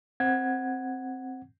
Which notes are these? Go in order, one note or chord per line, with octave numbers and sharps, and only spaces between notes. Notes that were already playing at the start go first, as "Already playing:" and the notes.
C4 F#5 G#6